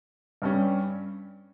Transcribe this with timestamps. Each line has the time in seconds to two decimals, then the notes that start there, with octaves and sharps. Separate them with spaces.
0.42 G2 G3 C#4